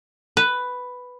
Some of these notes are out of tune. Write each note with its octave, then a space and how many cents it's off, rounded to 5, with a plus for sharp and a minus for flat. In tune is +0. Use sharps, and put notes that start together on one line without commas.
B4 +5